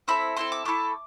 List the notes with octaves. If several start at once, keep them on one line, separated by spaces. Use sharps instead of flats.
C4 E4 A4 B5
C4 E4 A4 C6
D6
A3 E4 A4 D6